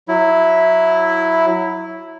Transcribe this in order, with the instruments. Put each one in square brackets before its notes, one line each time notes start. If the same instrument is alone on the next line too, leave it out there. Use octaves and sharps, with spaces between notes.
[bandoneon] F#3 E4